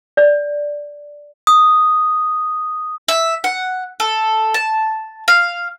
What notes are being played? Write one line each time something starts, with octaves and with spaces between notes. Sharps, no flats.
D5
D#6
E5
F#5
A4
A5
F5